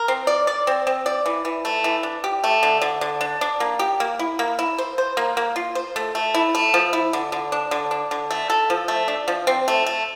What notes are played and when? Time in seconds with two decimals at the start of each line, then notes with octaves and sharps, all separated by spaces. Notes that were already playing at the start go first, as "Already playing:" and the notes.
Already playing: A#4
0.08 C4
0.27 D5
0.47 D5
0.67 C4
0.87 C4
1.06 D5
1.26 E3
1.45 E3
1.65 A3
1.84 E3
2.03 D4
2.24 G4
2.44 A3
2.63 D3
2.82 D3
3.01 D3
3.21 D4
3.41 D4
3.60 A#3
3.79 G4
4.00 A#3
4.19 E4
4.39 A#3
4.59 E4
4.78 C5
4.98 C5
5.17 A#3
5.37 A#3
5.56 F4
5.75 C5
5.96 A3
6.15 A3
6.34 E4
6.55 A3
6.74 F3
6.93 E4
7.13 D3
7.32 D3
7.52 D4
7.71 D3
7.91 D4
8.11 D3
8.31 A3
8.50 A4
8.70 F3
8.88 A3
9.08 D4
9.28 F3
9.47 C4
9.68 A3
9.86 A3